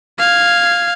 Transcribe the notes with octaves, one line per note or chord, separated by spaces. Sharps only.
F5 G#6